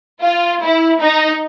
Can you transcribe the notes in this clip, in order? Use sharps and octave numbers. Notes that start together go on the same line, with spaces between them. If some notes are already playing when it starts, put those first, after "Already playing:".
F4
E4
D#4